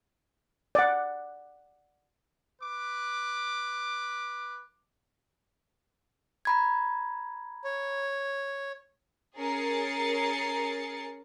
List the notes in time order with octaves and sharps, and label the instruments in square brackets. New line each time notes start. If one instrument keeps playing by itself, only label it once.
[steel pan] D5 F#5
[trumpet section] B4 D6
[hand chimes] A#5 B5 G#6
[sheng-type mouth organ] C#5
[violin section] C#4 G#4 A#4 A6 C7 C#7